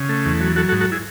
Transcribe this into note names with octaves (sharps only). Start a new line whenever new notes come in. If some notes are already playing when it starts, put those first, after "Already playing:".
Already playing: C#3
A3
E2
F#3
F#3 F#4 A4
F#4 A4
G#2
F#4 A4
E4 G#4